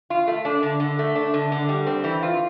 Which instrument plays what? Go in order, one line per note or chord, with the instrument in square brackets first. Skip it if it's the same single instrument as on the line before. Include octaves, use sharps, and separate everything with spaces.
[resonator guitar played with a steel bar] F4
A3
D4
D3
D3
A3
D4
D3
D3
G3
C4
E3
F4